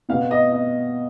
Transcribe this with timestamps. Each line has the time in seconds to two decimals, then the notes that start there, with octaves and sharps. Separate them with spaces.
0.09 B3 F5
0.12 B2
0.31 D#5
0.52 D#5